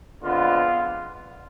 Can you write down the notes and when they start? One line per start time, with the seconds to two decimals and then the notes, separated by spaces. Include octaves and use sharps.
0.21 F2 D3 G#3 B3 F4